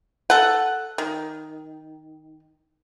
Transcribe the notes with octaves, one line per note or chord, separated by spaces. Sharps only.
A4 F#5
D#3